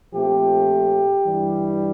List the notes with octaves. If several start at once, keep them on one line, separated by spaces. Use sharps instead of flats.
A#2 F3 A3 C4 G4
G2 E3 G3